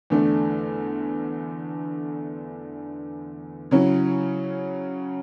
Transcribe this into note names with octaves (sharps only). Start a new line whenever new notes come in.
E2 D3 A3 D4
C#3 F#3 C#4 E4